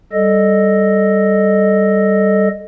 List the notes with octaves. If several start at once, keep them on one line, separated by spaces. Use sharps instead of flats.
G3 A4 D#5